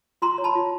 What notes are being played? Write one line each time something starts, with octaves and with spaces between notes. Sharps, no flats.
F4 A#5 C6
C#5
A5 B5
F4